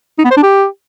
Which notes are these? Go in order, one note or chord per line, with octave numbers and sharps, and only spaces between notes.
D#4
B3
C5
D4
G4